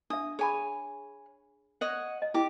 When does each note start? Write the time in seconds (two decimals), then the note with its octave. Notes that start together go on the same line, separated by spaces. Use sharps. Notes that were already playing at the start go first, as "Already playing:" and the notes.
0.10 D4 E5 D#6
0.39 G#4 C#5 G#5 B5
1.81 C#5 D#5 F#5
2.22 D#5
2.34 E4 G4 D6